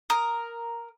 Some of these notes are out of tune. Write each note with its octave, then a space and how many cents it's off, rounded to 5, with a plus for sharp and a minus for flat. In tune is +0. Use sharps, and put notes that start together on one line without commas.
A#4 +0 D#6 +0